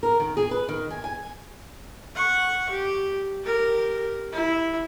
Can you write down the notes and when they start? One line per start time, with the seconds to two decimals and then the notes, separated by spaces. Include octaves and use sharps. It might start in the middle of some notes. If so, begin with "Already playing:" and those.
0.03 A#4
0.20 D#3
0.37 G#4
0.51 B4
0.69 D#3
0.91 G#5
1.04 G#5
2.15 F#5 C#6
2.69 G4
3.43 G4 A#4
4.32 E4